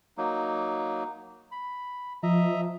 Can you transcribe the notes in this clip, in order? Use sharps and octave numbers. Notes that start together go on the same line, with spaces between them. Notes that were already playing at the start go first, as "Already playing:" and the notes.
F#3 A#3 D#4
B5
F3 D#5 E5 A#5